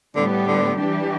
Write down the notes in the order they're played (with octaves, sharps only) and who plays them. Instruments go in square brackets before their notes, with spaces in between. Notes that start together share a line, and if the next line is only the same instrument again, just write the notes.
[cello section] A2 G3 B3 G4 [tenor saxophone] D3
[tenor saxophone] D3
[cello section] E3 G3 D4 G4